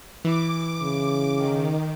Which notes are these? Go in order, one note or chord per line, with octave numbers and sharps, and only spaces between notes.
E3 E4 D6
C#3
D#3